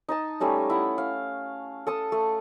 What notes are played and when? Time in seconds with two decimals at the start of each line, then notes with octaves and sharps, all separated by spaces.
0.08 D#4 D#5 A5
0.40 G3 A3 C#4 D#4
0.70 E4 F#5
0.98 F5
1.87 A4 A5 D#6
2.12 A3